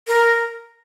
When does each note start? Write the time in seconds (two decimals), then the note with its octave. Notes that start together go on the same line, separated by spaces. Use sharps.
0.07 A#4